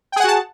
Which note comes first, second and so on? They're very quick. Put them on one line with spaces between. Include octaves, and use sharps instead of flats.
G5 G#4 F#5 F#4 A5